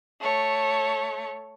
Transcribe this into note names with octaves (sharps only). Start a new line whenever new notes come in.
A3 C#5